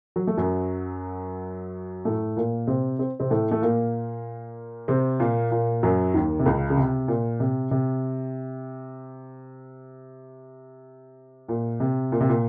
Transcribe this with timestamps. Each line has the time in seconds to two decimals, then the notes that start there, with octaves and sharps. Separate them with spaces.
0.16 F#3
0.27 A3
0.37 F#2 F#3
2.05 A2 A3
2.36 A#2 A#3
2.67 C3 C4
2.99 C4
3.20 C3 C4
3.30 A2 A3
3.51 A3
3.62 A#2 A#3
4.88 C3 C4
5.19 A#2 A#3
5.51 A#2 A#3
5.83 F#2 F#3
6.14 D#2 D#3
6.39 C3
6.46 C#2 C#3
6.70 C#3
6.77 C3
7.08 A#2
7.40 C3
7.71 C3
11.48 A#2
11.80 C3
12.12 A#2
12.20 C3
12.29 A#2